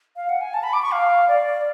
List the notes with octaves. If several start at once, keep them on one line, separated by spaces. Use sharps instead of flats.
F5
F#5
G#5
A5
B5
D6
C#6
F5
D5